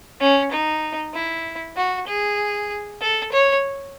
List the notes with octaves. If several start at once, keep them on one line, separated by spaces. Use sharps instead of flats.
C#4
D#4
E4
F#4
G#4
A4
C#5